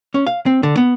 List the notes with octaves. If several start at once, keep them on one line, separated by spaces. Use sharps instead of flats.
C#4
F5
C4
D3
B3